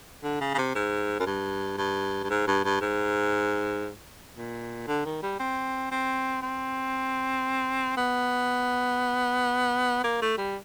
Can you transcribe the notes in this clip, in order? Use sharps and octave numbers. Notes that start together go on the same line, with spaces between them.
D3
C#3
C#3
C3
G#2
F#2
G2
G2
G2
G#2
G2
G2
G#2
A#2
D3
D#3
G3
C4
C4
C4
B3
A#3
A3
G3